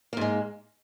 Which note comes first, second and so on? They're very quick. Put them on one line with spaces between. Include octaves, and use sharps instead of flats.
A#3 G#2 G#3